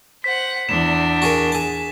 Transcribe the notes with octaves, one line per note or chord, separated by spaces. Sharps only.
C5 F#5 B6
E2 D4 E7
F#4 G#4 A#4
G#4 A5